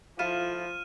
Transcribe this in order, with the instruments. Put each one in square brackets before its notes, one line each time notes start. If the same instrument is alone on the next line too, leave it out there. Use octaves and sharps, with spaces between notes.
[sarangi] F3 [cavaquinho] E4 F4 A4 [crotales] F6 D#7 E7